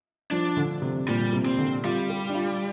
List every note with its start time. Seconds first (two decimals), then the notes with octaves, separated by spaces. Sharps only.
0.31 F3 D4
0.57 D3
0.82 C3
1.08 A#2 G3
1.33 C3
1.45 C4
1.58 D3
1.84 G3 F4
2.09 G4
2.30 D4
2.35 F4